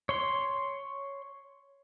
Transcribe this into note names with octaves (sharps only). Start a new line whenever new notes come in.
C#5 C6